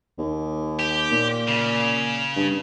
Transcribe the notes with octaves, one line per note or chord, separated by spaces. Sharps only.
D#2
G4
A#2
C#3
G2